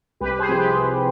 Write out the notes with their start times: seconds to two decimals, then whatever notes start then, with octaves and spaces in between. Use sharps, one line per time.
0.21 C2 G4 B4
0.39 G#4 C5
0.49 C3 F3
0.57 G4 B4
0.76 C2